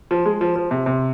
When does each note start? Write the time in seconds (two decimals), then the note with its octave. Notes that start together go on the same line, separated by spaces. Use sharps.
0.11 F3
0.26 G#3
0.41 F3
0.56 F3
0.71 C3
0.86 C3